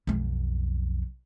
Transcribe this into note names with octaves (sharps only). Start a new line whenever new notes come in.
B1 F2